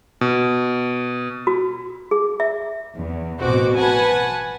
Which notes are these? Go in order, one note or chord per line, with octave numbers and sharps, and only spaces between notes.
B2
F#4
G#4
E5
E2
A1 B2 C4 F#4 D6
B4 F#5 G#5 A5